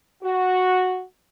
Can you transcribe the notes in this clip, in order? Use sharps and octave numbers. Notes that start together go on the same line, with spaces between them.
F#4